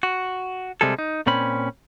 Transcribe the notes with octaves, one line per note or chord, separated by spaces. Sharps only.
F#4
C3 G3 G#3 G#4 A4
D#4
A#2 C4 C#4 B5